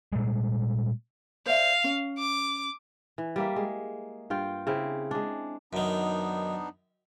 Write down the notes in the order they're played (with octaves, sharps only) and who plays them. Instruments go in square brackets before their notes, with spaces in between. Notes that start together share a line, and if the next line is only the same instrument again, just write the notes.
[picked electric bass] A#2 G3 G#3
[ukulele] C5 D5 E5 [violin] F5
[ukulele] C#4
[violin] D6
[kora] E3
G3 A#3 E5
G#3
G2 F4 G5
C#3 C4 E4
G#3 D4
[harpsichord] F#2 D#3 [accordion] B3 D4 D#4